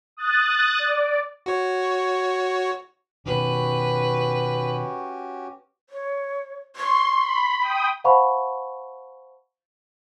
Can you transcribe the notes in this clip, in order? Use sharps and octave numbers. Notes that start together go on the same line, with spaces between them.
D#6 F#6 A6
D5
F#4 C#5
B2 D#3 C#4 F#4 G4 B4
C#5
C6 C#6
B5
G5 D#6
C5 F5 F#5 A5 B5 C#6